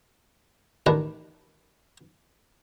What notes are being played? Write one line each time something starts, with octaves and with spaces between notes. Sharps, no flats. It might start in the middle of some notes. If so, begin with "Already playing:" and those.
A1 D#3 D4 A#4 B4